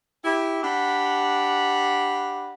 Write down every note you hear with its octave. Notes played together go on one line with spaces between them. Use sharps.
E4 G4
D4 G4 F#5 B5